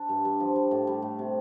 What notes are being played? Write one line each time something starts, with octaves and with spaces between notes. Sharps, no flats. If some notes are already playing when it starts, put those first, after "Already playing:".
Already playing: D4
G2
G2
F3
G3
A2
G3
A2
C3